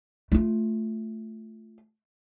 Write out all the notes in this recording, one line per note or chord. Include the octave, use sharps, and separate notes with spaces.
A3 F4